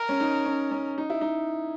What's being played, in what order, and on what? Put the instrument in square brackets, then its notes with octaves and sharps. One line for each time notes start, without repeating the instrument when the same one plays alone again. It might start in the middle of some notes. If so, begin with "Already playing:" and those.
Already playing: [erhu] A#4
[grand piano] C#4
D#4
C#4
C#4
D#4
E4
D#4